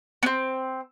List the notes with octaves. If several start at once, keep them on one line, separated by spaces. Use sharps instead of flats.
B3 C4